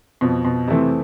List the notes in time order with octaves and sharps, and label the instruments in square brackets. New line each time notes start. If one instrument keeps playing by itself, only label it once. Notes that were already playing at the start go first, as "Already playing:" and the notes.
[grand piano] F2 [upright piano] B2
[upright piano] B2
[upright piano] C3 [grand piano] E3 A3 C4